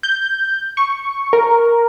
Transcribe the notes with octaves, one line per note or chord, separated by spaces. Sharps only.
G6
C#6
A#4